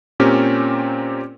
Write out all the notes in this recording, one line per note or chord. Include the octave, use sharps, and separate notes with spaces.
A#2 C4 C#4 G4 A#4